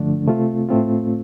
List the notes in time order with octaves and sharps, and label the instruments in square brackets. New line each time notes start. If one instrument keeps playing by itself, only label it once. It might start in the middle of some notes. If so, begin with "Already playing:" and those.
Already playing: [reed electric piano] G2 D3 F3 A3 D4
C3 A3 C4 F4
A2 A3 C4 F4